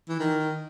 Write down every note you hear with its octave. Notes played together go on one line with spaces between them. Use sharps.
E3
D#3